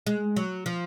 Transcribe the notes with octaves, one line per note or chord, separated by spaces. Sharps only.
G#3
F#3
F3